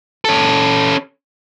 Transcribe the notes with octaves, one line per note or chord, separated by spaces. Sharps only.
C#4 A4